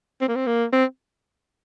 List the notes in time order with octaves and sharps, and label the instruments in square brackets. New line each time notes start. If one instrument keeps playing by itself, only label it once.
[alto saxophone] C4
A#3
C4
A#3
C4